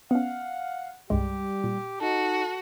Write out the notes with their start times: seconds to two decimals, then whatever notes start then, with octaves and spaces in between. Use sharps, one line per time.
0.11 B3 C#4 F5 F#5
1.10 C2 G2 G3 G#3 G4
1.64 A#2
2.01 D#4 F#4 A4